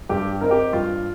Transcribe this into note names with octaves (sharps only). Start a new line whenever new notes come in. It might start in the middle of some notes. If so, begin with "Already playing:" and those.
G2 G4
D#3 C4 D#4 A#4
G4
G2 F4